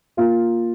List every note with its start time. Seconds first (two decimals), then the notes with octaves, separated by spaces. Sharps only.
0.17 A#3 F4